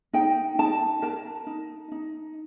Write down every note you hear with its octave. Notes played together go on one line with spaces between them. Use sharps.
D#4 G5
D#4 A5
A#4 A5
D#4
D#4